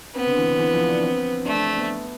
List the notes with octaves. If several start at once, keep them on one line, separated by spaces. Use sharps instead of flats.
B3 C4
D3
E3
D3
E3
F3
D4
C4
A3 D4
C4
D4
B3